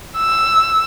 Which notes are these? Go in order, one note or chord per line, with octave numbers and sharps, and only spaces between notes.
E6